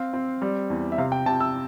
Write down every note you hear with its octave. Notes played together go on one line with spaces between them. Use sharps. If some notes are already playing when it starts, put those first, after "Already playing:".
Already playing: C4 F5
C4
G3
E2
E5
C3 F5
G5
C3 A5
E6